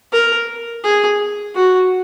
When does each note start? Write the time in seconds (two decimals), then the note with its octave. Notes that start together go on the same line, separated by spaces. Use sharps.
0.12 A#4
0.84 G#4
1.55 F#4